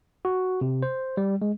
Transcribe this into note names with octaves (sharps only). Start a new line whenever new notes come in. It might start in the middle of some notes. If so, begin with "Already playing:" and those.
F#4
C3
C5
G3
G#3